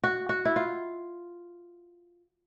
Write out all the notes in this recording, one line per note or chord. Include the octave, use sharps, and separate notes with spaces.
F#4
F#4
E4
F4